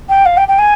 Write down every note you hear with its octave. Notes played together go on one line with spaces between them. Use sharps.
G5
F5
G5
G5
G#5